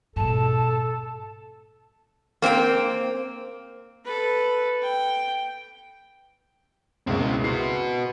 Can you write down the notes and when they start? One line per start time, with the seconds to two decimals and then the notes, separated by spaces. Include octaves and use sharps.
0.16 G#2 B2 A4 A5
2.42 A#3 C4 D4 G5
4.05 A4 B4
4.82 G5
7.07 C#2 B2 A#3 C4 E4
7.44 F#4 B4 C6 C7